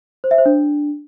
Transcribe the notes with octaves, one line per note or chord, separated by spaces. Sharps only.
C5
E5
C5
D4